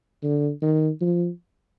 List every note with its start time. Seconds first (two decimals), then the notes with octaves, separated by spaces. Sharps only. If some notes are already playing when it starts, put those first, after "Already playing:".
0.24 D3
0.62 D#3
1.01 F3